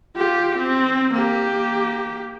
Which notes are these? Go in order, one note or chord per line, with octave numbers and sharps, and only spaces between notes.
F4 G4
C4
A#3 G4